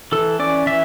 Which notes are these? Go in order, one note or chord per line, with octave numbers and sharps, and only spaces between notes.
E3 A4
C#4 D5
E3 E5